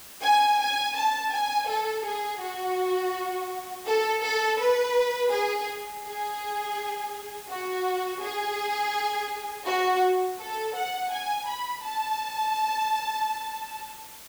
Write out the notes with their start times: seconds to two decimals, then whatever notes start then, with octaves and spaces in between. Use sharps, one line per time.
0.23 G#5
0.60 G#5
0.96 A5
1.32 G#5
1.68 A4
2.05 G#4
2.40 F#4
3.86 A4
4.22 A4
4.59 B4
5.30 G#4
6.04 G#4
7.49 F#4
8.22 G#4
9.66 F#4
10.38 A4
10.75 F#5
11.12 G#5
11.47 B5
11.84 A5